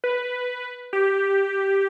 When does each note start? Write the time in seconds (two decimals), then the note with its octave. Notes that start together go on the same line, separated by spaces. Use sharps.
0.04 B4
0.93 G4